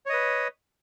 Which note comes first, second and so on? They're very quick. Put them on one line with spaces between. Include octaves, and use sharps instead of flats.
C#5 D#5 B4